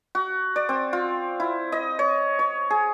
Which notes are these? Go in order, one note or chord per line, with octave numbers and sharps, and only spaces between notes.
F#4
D5
C4
F4
E4
D#5
C#5
C#5
G#4